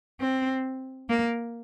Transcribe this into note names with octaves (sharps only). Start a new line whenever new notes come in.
C4
A#3